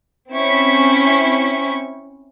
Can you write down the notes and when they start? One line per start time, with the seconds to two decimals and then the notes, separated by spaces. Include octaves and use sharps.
0.32 C4 C#4 E4 C#6 B6